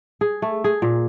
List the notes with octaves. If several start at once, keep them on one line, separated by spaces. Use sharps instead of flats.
G#4
A3
G#4
A#2